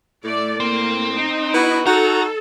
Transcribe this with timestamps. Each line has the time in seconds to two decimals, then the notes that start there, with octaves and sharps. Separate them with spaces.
0.24 A2 A3 D5
0.60 A#3 C4
1.16 D#4
1.54 B3 E4 F#4 B4
1.87 D#4 F#4 A4 A#5